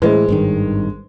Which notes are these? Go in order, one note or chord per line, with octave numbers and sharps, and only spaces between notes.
A2 E3 G#3 B4 C5 D#5
G#1 G2 D#3